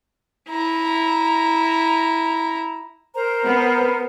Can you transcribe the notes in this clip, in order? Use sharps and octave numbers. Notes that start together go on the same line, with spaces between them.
E4 A#5
A#4 C5 A#5
B3